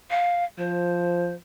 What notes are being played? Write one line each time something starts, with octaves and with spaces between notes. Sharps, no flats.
F5
F3 C5